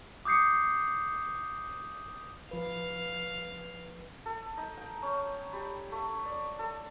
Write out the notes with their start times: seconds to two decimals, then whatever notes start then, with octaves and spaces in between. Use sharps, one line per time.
0.25 D6 D#6 G6 C7 C#7
2.51 F3 B4 F5
4.26 A4
4.57 D#4
4.77 G5
5.02 C#4
5.53 G3
5.92 A3
6.26 D5
6.59 A4